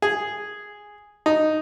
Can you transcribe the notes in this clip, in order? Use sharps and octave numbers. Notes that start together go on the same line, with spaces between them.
G#4
D#4